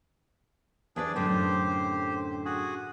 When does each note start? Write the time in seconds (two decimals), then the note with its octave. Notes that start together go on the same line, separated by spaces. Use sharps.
0.96 E2 D4 G#4 B4 D5
1.16 F#2 A2 D3 G4 C5
2.45 F#4 G#4